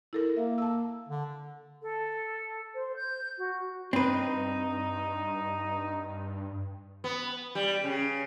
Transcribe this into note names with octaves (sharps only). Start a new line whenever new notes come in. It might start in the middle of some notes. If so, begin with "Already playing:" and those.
E4 A4 A#4
A#3 E5
A5 E6
D3
A4
C5
G6
F#4
G2 C4 D#4 B4
B3
G3
C#3